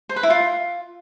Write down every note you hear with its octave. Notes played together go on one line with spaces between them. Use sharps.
C5
B4
E4
F4